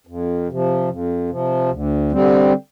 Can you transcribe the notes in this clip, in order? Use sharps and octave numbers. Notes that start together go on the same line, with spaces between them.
F2
C3 F3
F2
C3 F3
D2
D3 G3 C4